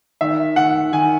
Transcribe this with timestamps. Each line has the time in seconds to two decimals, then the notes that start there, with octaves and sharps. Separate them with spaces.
0.21 D#3 E5
0.56 D#3 F#5
0.92 D#3 G#5